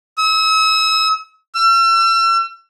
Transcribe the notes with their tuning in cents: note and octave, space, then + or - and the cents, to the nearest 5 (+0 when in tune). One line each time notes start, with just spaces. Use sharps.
E6 -40
E6 +40